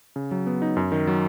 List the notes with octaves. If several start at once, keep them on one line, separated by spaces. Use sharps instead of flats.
C#3
F#3
B3
D#4
F#2
D#3
F#3